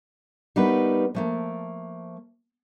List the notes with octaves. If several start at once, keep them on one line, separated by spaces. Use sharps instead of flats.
G3 A3 B3 D#4 A#4 B4
F3 A3 A#3